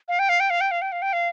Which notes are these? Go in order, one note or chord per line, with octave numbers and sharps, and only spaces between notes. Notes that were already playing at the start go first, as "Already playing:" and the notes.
F5
G5
F5
G5
F5
G5
F5
G5
F5
G5
F5